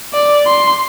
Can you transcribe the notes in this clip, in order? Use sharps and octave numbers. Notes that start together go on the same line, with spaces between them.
D5
C6